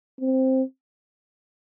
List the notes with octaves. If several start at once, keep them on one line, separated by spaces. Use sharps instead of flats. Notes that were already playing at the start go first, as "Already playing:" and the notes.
C4